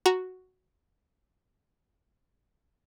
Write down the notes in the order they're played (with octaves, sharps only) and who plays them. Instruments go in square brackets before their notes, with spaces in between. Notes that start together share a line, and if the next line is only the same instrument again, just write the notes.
[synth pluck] F#4 A#5